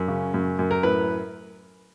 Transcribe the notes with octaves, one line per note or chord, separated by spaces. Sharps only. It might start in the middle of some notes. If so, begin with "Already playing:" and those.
Already playing: F#2
C#3
F#2
F#2
A#4
A2 B4